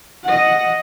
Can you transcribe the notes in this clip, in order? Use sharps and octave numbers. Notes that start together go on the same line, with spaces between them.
D#5 F#5